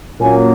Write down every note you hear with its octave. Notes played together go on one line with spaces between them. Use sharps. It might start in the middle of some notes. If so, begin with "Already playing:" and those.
A#2 F#3 A#3 C#4 G#5